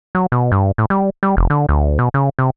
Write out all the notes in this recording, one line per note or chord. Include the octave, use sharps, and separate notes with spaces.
F#3
B2
G2
A2
G3
G3
F1
D3
D2
B2
C#3
C3